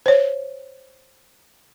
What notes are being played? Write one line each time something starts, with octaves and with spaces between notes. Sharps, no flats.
C5 C#5